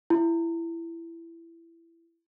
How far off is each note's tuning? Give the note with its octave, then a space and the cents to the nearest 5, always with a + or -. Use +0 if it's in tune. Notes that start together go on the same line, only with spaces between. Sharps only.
E4 +20